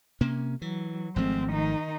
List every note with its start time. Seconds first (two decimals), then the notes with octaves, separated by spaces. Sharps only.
0.21 C3 A#3 C#4
0.62 E3 F#3
1.16 G#1 F3 G#3 A3 C4
1.49 D#3 D#4